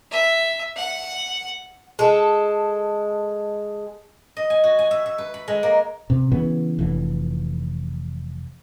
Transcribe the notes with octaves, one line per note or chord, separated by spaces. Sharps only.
E5
F#5
G#3 A4
D#5
G#5
F#4
G#5
E5
E5
B4
B5
G#3
A#3
C3
C#3 E3 B3
F1 D3 E3